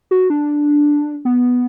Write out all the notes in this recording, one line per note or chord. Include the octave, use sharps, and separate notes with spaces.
F#4
D4
B3